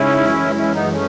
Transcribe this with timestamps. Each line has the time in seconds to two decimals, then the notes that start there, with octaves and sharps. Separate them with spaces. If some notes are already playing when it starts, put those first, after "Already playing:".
Already playing: C#3 G#3 C#4 D#4 E4
0.24 F#2 E3 G#3
0.58 C#4 E4
0.74 B3 D#4
0.91 A3 C#4